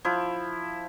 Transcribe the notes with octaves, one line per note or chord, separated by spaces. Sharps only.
F3 E4